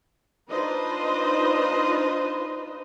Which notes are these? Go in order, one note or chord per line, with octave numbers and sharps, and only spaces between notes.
D4 D#4 F4 B4 C5 D#5